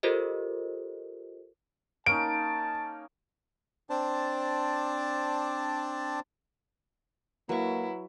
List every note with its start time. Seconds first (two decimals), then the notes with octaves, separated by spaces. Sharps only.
0.03 F4 G4 A4 A#4 C5 D#5
2.06 A#3 C#4 D#4 A5 D7
3.90 C4 D4 C5 D5 A5
7.49 F#3 A#3 E4 B4 F#5 A#5 C#6